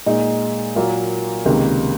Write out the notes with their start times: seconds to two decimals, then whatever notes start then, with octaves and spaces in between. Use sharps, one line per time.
0.06 A#2 G#3 D#4
0.76 A#2 F#3 A#3 F4 A#4
1.46 C#2 C3 D#3 A#3